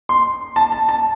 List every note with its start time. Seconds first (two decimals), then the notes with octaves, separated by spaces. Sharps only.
0.09 C6
0.56 A5
0.72 A5
0.89 A5